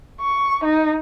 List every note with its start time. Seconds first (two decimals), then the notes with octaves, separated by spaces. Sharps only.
0.21 C#6
0.64 D#4